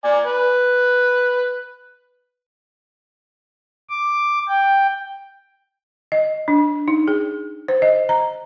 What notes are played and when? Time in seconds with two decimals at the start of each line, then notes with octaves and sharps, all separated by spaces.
0.04 D5 G#5
0.25 B4
3.89 D6
4.48 G5
6.12 D#5
6.48 D4
6.88 D#4
7.08 G#4
7.68 C5
7.82 D#5
8.09 A#5